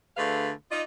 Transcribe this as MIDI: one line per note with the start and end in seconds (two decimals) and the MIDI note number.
0.17 0.51 38
0.17 0.51 50
0.17 0.51 57
0.17 0.51 68
0.17 0.51 71
0.17 0.51 77
0.71 0.82 63
0.71 0.82 65
0.71 0.82 74
0.71 0.82 75